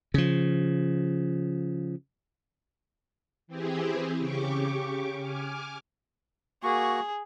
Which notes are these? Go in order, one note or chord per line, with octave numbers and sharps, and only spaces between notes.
C#3 F3
E3 C4 E4 G4 G#4
C#3 G4 C#6 D6
G#5 D6 F6
A#3 F#4 G#4 C#6